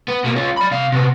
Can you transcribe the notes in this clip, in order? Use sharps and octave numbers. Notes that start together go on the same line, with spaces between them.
B3
B2 A#3
C#4 F4
D5 B5
C3 F5
C3 B3